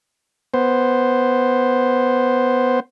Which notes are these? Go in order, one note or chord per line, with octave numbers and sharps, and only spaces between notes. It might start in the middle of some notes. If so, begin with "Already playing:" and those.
B3 C5